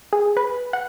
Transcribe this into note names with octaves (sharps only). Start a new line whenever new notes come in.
G#4
B4
F#5